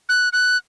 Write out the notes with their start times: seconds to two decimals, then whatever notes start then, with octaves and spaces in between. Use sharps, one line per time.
0.09 F#6
0.33 F#6